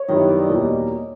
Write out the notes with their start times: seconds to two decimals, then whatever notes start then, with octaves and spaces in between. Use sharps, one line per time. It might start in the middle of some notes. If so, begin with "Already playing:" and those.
Already playing: C#5
0.08 F#2 D#3 G3 B3 E4 D#5
0.19 E5
0.29 D5
0.39 D#5
0.49 E2 B2 G3 A#3 D#4